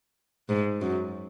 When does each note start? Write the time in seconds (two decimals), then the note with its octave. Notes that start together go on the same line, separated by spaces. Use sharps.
0.49 G#2
0.81 F#2